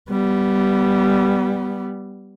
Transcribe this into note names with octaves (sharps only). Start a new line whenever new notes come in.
G3 B3